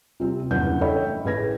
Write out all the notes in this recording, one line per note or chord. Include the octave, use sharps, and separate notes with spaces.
C3 G3 C4
F#1 E2 G2 C#3 F#5 G6
A4 C#5 D#5 E5 G5 B5
A2
A1 G#4 B4 G#6 A#6